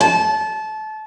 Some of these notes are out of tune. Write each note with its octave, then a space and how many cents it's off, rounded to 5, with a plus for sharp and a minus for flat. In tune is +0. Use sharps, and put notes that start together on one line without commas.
A5 -25